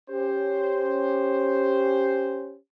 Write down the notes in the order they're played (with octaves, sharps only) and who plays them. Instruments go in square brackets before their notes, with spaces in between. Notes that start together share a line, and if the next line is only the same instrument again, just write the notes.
[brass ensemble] C#4 G4 C5